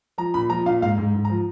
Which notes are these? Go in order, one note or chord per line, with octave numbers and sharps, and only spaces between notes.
F3 A#5
A#2 B5
F3 A#5
A#2 F5
G#2 F5
G#2
G#2
A#5
F3